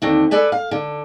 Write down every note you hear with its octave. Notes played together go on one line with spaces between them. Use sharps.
D#2 D3 C4
A4 B4 D5 G#5
F5
D3